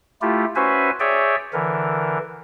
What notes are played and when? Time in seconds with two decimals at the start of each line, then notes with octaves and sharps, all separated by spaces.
0.22 A3 E4 F4 G4
0.56 C#4 F#4 B4 C5 E5 G#5
1.00 G#4 C#5 D5 E5 G5
1.53 D3 E3 A#4